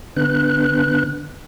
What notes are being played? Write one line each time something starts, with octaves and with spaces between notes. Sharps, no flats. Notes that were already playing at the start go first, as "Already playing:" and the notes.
D3 B3 D4 B4 F#6